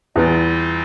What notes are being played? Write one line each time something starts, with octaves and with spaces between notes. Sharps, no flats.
E2 E3 G3 C4 F4